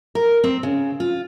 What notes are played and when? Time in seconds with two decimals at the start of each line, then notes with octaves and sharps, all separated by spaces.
0.15 A#4
0.44 C4
0.63 C#3
1.00 F4